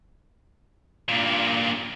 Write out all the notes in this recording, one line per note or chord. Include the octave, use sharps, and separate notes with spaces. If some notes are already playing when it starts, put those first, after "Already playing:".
G2 A#2